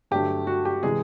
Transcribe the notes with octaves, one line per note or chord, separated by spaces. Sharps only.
G2 D3 F#3 A3 G4
F#4
G4
C3 E3 G#3 G#4